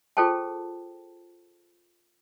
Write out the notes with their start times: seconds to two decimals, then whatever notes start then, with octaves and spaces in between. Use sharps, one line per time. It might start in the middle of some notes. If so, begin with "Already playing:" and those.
0.17 F4 G#4 A4 C5 G5 A5